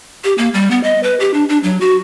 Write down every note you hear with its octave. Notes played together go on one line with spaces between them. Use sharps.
G4
A#3
G3
B3
D#5
B4
G4
D4
D4
F#3
F#4